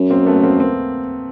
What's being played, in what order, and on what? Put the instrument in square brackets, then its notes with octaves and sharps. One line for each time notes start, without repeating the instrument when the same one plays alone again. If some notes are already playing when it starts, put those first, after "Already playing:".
Already playing: [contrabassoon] F#2
[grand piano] A#3 C4
A3 B3
A#3 C4
A#3 C4